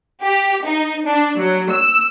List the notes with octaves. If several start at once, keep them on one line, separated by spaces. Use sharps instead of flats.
G4
D#4
D4
F#3
E6